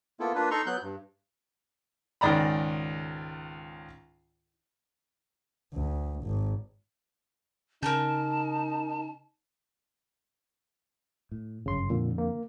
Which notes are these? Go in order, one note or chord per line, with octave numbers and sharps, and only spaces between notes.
A#3 B3 E4 F4 A4
A#3 D4 F4 B4
D#4 A4 A#5 C6 C#6
F#3 B3 F#6 G6
G2
C#2 G#2 D#3 D5 A#5 B5
D2
G#1
C#3 D#4 A#4 A5 A#5 G6
A2
G1 F#2 C#3 C6
F2 A#2 D3
A#3